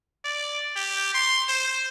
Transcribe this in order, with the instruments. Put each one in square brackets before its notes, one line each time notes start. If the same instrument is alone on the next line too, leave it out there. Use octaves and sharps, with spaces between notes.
[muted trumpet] D5
G4
C6
C5